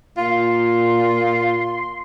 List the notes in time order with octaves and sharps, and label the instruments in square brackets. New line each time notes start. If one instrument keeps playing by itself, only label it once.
[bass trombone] A#2 [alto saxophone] F4 [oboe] C6